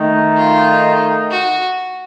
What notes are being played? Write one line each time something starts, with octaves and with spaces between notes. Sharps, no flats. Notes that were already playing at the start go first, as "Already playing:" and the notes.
Already playing: D#3 A3 D#4
F4
F#4